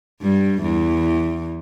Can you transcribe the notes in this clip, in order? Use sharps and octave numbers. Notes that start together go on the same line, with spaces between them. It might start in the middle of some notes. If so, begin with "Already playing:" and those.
G2 G3
E2 E3